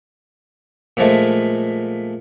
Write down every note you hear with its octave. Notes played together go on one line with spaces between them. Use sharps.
A#2 F3 G#3 A3